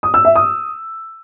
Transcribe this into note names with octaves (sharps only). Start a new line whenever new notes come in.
D#6
E6
E5
D#6